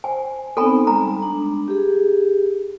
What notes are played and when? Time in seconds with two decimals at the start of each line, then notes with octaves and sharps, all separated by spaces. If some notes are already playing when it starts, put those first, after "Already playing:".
0.04 C5 G#5
0.57 B3 C4 D#4 A4 G#5 B5
0.87 G3 G#3 A#5
1.22 D4
1.68 G4 G#4